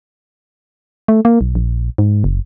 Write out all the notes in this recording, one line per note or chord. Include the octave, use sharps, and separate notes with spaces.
A3
A#3
B1
A#1
G#2
F#1